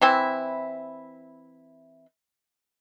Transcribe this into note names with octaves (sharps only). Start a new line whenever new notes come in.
E3 C4 E4